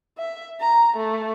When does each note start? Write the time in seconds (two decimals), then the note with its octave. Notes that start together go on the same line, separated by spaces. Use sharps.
0.18 E5
0.61 A#5
0.96 A3